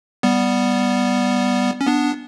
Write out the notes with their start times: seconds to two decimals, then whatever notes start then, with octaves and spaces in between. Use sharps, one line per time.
0.23 G3 B3
1.81 C#4
1.87 B3 D4